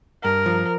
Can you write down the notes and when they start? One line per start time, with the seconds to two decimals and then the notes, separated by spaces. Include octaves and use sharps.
0.23 G2 A#4
0.46 F3